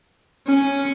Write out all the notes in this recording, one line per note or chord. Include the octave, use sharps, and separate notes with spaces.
C#4